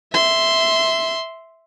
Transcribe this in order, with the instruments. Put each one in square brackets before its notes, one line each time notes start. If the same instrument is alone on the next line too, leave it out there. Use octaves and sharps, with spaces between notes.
[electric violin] E5 C6